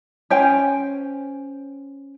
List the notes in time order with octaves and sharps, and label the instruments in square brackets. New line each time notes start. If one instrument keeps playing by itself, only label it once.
[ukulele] C#4 C5 G5 G#5